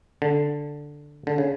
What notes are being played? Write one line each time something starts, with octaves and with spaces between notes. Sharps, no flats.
D3
D3
C#3